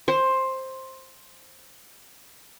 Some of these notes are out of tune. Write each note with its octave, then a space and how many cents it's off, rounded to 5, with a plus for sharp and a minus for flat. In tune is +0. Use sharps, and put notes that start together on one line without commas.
C5 +10